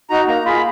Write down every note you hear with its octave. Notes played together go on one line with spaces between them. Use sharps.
D#4 F#4 A#5
A#3 A#5
F4 G#4 B5